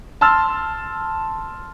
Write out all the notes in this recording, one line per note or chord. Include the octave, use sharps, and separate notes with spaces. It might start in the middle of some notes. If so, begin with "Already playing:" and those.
A5 C6 E6 F6 A6